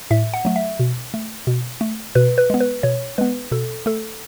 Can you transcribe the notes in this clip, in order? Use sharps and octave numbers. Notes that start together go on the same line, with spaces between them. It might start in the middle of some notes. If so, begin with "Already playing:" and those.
A2 E5
F#5
F#3 A3
E5
B2
A3
B2
A3
B2 B4
B4
G#3 B3
B4
B2 C#5
G#3 B3 B4
B2 A4
A3 A4